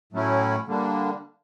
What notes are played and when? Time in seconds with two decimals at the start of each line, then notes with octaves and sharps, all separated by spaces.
0.13 A2 F#3 A3 C#4 E4
0.67 D3 G3 A#3 D4